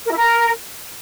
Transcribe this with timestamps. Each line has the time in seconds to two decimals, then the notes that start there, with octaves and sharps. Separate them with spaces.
0.06 A#4
0.11 E4
0.17 A#4